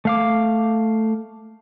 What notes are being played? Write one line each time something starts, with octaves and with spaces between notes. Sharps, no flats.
A3 F5 D6